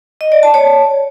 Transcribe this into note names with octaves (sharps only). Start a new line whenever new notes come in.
D#5
D5
A5
C#5